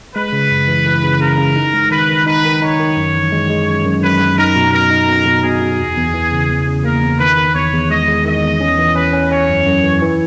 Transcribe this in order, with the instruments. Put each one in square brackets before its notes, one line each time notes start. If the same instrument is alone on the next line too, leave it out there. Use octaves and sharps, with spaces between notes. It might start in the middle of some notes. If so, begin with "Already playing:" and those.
[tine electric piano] G#3 [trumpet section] B4
[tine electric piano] C#3
F#2
E3
E3
C#3
[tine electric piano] C#3 [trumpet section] A#4
[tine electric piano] C#3
D#4
G#3
[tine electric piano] D#3 [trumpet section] B4
[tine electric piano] D#3
[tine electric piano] D#4 [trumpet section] B4
[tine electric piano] D#3
[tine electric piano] D#4 [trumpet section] C#5
[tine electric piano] D#3
F#2
E3
G#3
G#3
F#2
F#2
[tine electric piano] F#2 [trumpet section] B4
[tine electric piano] F#2
[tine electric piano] D#4 [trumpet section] A#4
[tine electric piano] B2
[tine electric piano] B2 [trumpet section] A#4
[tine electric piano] D#4
B2
B2
[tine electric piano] B2 [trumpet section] G#4
[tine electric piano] B2
E2
E2
E3
C#3
E2
C#3
[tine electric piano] A#3 [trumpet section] A#4
[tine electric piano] E2
[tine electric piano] D#3 [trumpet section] B4
[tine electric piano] D#3
[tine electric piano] E2 [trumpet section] C#5
[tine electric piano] E2
[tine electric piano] G#3 [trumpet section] D#5
[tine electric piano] G#3
[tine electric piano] D#3 [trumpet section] D#5
[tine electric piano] E2
C#4
E3
[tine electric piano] C#4 [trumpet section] B4
[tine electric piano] C#4
[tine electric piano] C#4 [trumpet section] C#5
[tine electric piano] F#2
F#2
E3
E3